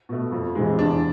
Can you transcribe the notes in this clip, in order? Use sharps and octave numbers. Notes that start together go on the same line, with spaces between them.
B2 A3
F2
C3 E3 G#3
E2 D4